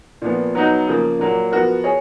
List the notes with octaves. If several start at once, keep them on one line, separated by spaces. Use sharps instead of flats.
A#2 F3 B3
F#3 B3 D#4 F#4
C#3 F3 A#3
A#2 F#3 A#3
F3 B3 F#4 A#4
G#4 C#5